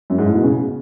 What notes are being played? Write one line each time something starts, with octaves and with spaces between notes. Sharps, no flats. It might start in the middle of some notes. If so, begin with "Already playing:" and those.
F#2
G#2
A2
B2
C#3